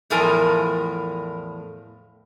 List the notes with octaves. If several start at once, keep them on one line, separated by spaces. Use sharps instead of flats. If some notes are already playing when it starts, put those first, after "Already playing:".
E2 A2 F3 A#4 G#5 A#5